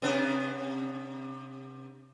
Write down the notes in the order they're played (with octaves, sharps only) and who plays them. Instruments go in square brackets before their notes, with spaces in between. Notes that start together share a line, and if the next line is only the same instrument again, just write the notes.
[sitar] C3 B3 D4